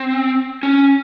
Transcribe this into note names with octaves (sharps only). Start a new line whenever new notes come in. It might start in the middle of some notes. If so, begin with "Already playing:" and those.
Already playing: C4
C#4